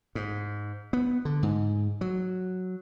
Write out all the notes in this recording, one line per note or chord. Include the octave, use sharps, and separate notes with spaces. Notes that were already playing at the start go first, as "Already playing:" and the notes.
G#2
B3
D3
G#2
F#3